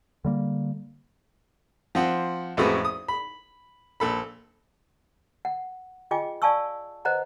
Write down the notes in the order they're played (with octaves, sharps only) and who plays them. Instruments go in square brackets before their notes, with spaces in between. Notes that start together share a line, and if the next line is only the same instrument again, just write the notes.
[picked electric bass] D3 G3 A#3
[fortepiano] F3 C4 F#5
A1 F2 G#3 A3 F#4 B4
D#6
B5
A#1 A4 B5
[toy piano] F#5
F4 G#4 D#5 G5 G#5 D6
D5 F5 G#5 A5 C#6 E6
B4 C5 D#5 F#5 A#5